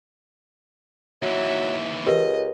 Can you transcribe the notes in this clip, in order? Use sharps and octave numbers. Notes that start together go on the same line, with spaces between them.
D#2 E3 F#3 E5
C#2 G4 A#4 B4 D#5